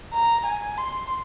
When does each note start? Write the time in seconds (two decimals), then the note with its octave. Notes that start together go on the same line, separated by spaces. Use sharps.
0.14 A#5
0.46 G#5
0.77 C6